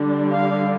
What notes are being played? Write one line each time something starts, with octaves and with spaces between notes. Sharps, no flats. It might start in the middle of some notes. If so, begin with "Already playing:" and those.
Already playing: D3 G3 D4
F5